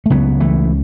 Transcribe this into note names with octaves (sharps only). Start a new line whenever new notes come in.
A3
C#2 C#3 F#3 B3
E3 A3